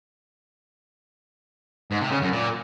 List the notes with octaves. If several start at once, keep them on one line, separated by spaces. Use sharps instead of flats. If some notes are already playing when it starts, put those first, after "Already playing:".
G#2
C3
C#3
F#2
A#2